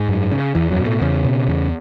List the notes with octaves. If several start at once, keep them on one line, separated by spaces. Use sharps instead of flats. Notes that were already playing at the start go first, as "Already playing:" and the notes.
Already playing: G#2 G#3
F#2
C#3
E2 E3
F#2 F#3
B2
A2 A3
E2 C#3 C#4
B2
E2